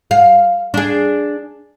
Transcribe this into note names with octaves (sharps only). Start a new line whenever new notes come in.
F5
D4 G#4